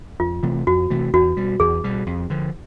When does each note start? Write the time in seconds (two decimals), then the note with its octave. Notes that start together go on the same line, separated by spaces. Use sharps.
0.20 F2 F4
0.43 C3 E3 A3
0.67 F2 F#4
0.90 C3 E3 A3
1.13 E2 F#4
1.36 B2 G3
1.60 E2 G#4
1.84 B2 G3
2.07 F2
2.30 D3 F3